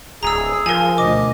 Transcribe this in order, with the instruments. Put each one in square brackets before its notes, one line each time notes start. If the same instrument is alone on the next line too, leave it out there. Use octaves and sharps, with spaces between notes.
[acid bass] D1 [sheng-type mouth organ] G#4 [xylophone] A#5 E6
[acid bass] F3 [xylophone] A#4 G#5
[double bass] D2 B2 [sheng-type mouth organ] D#5 [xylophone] D6